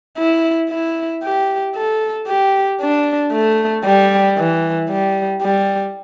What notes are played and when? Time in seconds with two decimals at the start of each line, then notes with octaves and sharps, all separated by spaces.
0.18 E4
0.70 E4
1.24 G4
1.76 A4
2.28 G4
2.81 D4
3.32 A3
3.85 G3
4.38 E3
4.90 G3
5.42 G3